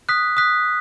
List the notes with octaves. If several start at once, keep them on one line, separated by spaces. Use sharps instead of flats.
D#6 F#6 B6
D#6 F#6 B6